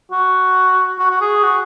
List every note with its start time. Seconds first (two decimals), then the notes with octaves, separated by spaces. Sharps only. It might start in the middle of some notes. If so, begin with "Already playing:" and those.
0.12 F#4
0.99 F#4
1.11 F#4
1.21 G#4
1.44 F#4